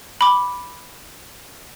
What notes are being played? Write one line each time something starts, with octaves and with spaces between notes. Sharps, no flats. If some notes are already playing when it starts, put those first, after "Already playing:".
B5 D6